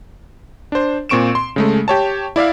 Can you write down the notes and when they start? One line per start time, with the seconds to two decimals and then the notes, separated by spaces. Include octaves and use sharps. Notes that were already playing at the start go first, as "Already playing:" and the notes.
0.72 D4 C5
1.09 A#2 C4 C#6 D7 E7
1.35 C6
1.56 C#3 G#3 A3
1.88 G4 C#5 A5
2.36 E4 D5 E5 F5